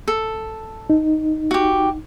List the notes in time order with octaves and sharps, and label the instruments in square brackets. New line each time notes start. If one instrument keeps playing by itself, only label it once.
[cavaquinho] A4
[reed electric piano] D#4
[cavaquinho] F#4 G4